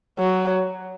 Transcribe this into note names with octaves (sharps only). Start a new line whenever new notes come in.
F#3